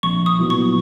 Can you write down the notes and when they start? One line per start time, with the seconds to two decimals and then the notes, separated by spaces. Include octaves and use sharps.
0.03 A#1 C#6
0.26 D#6
0.38 A#2 F#3 B3 E4
0.50 C#6